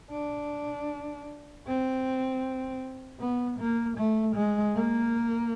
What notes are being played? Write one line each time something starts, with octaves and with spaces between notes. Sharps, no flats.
D4
C4
B3
A#3
A3
G#3
A#3